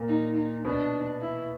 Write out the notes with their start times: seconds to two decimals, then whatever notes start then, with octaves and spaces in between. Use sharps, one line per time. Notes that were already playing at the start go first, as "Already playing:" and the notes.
Already playing: A#2 A#3
0.08 D#4
0.36 D#4
0.65 B2 B3 D4
1.21 E4